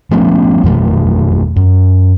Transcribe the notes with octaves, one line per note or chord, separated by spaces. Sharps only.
F3 A3 B3 C#4
F2 B2 D#3 A3
F#2